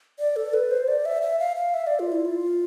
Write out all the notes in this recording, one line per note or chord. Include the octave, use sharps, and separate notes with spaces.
D5
A4
B4
C5
D5
E5
E5
F5
F5
E5
D5
F4
E4
F4